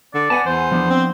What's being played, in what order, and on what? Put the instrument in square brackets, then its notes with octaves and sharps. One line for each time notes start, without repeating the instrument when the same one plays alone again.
[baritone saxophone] D3 [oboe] D5
[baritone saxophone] B3 [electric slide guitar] F#5 G#5 A5
[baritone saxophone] E2 [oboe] C5
[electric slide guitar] F3 B3 D4
[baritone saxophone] C4